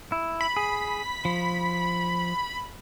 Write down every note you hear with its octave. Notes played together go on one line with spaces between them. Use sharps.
E4
B5
G#4
F3